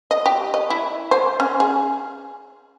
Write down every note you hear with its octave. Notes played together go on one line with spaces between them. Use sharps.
D#5
G4
D#5
E4
C5
C#4
G#4